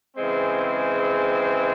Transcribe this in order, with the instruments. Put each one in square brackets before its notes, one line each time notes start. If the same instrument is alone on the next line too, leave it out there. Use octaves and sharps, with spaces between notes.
[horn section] C#3 E3 G#3 C4